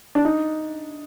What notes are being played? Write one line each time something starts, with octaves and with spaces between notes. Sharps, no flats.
D4
D#4